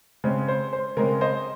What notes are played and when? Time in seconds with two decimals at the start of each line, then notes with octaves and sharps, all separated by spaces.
0.24 C#3 G#3 C4
0.48 C5
0.73 C5
0.97 C#3 G#3 C4 A#4
1.21 C5 D#5